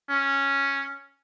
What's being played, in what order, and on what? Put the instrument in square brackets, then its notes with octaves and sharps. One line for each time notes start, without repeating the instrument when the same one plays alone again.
[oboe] C#4